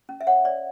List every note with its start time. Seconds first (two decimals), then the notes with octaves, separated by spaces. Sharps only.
0.09 C#4
0.21 E5
0.27 C#5 F#5
0.45 C#5 D5